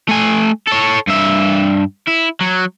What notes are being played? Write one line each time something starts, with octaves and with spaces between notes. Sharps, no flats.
A3 G#5
A4 C#5
G2 E5
E4
F#3